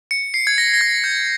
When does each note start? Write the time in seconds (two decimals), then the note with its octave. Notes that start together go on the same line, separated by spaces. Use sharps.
0.11 C#7
0.34 C7
0.47 G#6
0.58 A#6
0.74 A#6
0.81 G#6
1.04 G6